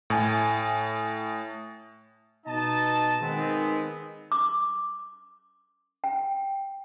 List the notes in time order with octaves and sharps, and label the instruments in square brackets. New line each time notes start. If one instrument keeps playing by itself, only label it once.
[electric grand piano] A2 G#5
[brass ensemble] B2 D#4 D#5 A5
D#3 G#3 B3 C4
[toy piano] D6
G5